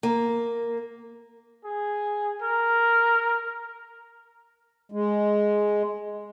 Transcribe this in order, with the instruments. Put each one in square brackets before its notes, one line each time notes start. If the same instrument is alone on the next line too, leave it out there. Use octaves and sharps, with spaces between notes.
[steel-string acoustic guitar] A#3
[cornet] G#4
A#4
[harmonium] G#3